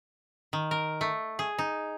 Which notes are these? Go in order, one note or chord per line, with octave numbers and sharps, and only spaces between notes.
D#3
A#4
A3
G#4
D#4